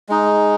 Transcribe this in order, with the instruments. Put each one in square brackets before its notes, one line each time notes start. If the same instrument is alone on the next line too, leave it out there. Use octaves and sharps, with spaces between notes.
[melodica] G#3 D#4